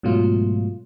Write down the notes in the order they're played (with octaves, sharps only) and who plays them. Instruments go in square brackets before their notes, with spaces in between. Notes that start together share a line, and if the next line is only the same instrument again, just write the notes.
[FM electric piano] G#2 B2 F#3 A3 F4